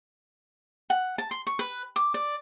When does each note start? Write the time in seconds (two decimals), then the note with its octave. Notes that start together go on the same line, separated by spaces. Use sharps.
0.90 F#5
1.18 A5
1.31 C6
1.47 C#6
1.59 B4
1.96 D6
2.14 D5